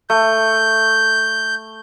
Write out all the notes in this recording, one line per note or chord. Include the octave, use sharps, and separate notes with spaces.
A3 G6